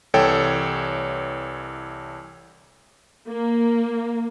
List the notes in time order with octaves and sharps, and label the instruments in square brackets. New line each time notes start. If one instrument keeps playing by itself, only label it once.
[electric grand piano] C2 E3 A4 C#5 G5
[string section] A#3